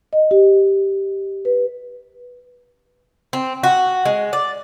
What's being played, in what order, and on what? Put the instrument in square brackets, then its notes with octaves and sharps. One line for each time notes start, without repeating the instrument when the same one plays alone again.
[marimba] D#5
G4
B4
[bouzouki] C4
F#4
G#3
D5